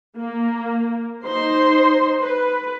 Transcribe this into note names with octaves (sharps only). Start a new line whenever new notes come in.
A#3
D#4 C5 C6
B4